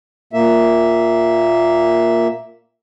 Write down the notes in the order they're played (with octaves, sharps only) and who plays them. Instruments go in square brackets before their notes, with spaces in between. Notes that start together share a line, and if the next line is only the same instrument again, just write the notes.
[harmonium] A#2 A#3 E5